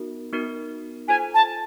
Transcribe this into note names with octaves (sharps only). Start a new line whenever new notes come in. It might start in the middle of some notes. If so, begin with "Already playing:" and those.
Already playing: B3 D#4 F#4 A#4
B3 D#4 F#4 A#4
F4 A4 C5 G#5
A5